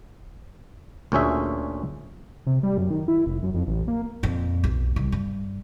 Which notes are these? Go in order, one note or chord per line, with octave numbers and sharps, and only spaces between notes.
D2 A#2 C#4 G#4 E5
C3
G3
F#2
D#3
E4
F1
F#2
F2
A1
A#3
F2 A#2
B1 B3
C2
G2